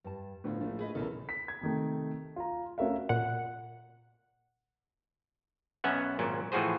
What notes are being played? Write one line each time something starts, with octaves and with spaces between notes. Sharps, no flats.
G2 A5
D2 A2 B3 F4
A#1 A3
G#4 B4 D#5
B1 E2 C#3 A4 A#4
B6
G#6
C3 D#3 A3
F4 A#5
A3 C#4 F#4 A#4 E5 F5
A#2 F#5
B1 B3 C#4 E5 F#5
G#1 A#2 F#3
A2 E3 F3 F#4 G#4 C5